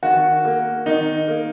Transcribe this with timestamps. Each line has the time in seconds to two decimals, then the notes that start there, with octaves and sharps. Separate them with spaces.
0.03 D#3 F#4
0.45 A#3
0.86 D#3 D#4
1.28 A#3